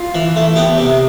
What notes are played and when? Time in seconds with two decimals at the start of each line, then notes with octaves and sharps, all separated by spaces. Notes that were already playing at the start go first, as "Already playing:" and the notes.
Already playing: F4
0.15 E3
0.36 A3
0.56 B3 G4
0.77 C3